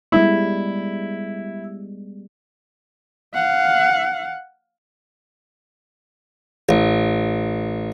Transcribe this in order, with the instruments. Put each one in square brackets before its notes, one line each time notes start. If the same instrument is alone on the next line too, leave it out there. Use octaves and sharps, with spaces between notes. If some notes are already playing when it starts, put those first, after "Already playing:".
[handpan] G3 G#3 B3 [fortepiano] E4
[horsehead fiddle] F5 F#5
[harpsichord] A1